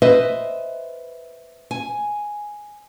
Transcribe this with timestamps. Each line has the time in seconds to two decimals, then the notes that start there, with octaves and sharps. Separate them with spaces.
0.02 B4 C5 D#5 E5
1.71 G#5